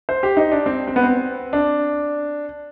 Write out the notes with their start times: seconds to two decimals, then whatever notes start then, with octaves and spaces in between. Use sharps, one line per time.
0.09 C5
0.23 G4
0.37 D#4
0.52 D4
0.66 C4
0.87 C4
0.96 B3
1.03 C4
1.53 D4